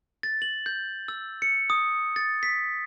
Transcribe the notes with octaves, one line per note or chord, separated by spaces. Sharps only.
A6
F#7
G6
E6
C#7
D#6
A6
B6